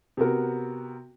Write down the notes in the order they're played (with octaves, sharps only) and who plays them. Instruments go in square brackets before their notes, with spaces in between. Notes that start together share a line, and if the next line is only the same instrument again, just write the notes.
[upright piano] C3 B3 F#4 A#4